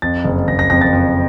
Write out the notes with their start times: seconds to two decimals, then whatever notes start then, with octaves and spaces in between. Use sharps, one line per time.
0.02 F2 A6
0.24 F#1
0.48 F#1 A#6
0.59 A#6
0.70 F2 A#6
0.81 A6
0.93 F2